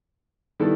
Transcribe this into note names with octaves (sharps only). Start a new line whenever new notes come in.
D#3 G3 B3 E4 A4